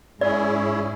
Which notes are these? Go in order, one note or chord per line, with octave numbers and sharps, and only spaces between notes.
G#2 C#4 E4 G#4 D5